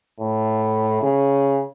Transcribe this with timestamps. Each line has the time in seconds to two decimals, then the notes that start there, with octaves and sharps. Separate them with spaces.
0.19 A2
1.02 C#3